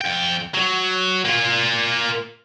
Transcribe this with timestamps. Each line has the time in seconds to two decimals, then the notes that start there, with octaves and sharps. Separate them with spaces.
0.01 F2 G5
0.54 F#3
1.25 A#3 F4